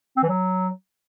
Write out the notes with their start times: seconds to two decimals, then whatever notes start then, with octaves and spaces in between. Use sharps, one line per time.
0.17 C4
0.23 E3
0.29 F#3